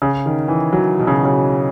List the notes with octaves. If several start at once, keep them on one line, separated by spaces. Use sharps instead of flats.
C#3
D#3
E3
F#3
B2
C#3
C#3